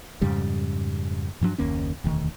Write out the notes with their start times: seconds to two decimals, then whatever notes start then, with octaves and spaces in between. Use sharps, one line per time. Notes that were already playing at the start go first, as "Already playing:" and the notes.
0.21 F2 G#2 C#3 G3
1.41 G2 F3 F#3 D4
1.58 F#1 D#2 A#3 C#4
2.04 E1 D2 D#3